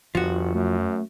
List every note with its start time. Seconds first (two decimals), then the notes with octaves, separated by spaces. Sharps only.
0.15 G1 F2 F3 F#4
0.55 F#2 A3